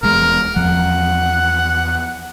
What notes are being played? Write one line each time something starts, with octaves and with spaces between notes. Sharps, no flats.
D#1 E2 G#3 A#4
E2 F3 F#5